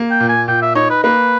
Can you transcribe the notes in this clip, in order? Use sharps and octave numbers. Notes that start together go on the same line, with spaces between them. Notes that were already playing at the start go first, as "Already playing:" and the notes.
Already playing: A#3
G5
A#2
G#5
A#2 G5
E5
D#4 C#5
B4
A#3 B4